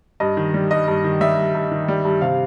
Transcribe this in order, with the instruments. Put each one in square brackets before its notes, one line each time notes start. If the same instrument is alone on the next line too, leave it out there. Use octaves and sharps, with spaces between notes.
[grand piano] G2 D#5
D#3
G3
G2 D#5
G2
D#3
G3 E5
G2
G2
D#3
G3
G2
C3 F5